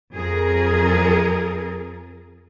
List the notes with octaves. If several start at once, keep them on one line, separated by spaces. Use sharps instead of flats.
F2 G#4 A#4